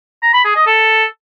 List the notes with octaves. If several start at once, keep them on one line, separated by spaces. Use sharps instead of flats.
A#5
B5
G#4
D#5
A4